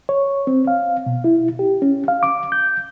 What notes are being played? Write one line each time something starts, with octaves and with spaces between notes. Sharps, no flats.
C#5
C4
F5
B2
E4
G4
C#4
F5
D6
G6